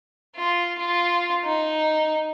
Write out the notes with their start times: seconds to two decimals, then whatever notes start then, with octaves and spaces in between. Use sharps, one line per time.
0.36 F4
0.78 F4
1.45 D#4